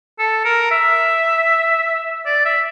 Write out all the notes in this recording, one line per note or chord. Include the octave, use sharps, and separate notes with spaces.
A4
A#4
E5
D5
E5